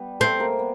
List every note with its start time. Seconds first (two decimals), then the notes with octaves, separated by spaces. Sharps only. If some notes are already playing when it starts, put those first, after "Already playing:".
Already playing: G3 B3 G4 B4
0.20 A3 C4 A4
0.40 A#3 A#4
0.59 B3